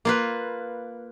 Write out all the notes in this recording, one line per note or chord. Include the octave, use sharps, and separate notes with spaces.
A#3 F4 B4